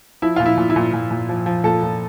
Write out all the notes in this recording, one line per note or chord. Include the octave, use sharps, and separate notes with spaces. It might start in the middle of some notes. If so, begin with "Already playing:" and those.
F3 E4
A#2 F4
E4
A#2
E4
A#2
A#2
A#2
F3
F3
A#2 A4
A#2